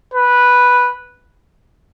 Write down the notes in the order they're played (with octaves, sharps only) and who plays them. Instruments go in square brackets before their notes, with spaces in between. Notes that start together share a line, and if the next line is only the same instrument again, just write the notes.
[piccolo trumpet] B4